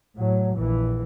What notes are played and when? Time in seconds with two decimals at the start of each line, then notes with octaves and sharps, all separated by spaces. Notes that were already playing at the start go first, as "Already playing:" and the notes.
0.15 A2 F#3
0.55 A#1 E3